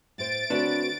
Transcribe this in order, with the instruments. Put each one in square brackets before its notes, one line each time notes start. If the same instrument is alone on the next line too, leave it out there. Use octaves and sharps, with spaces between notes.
[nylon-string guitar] A2 C5 [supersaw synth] A6 D7
[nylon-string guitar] D3 A3 C4 [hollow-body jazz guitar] D4 B4 C#5 [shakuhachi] F#4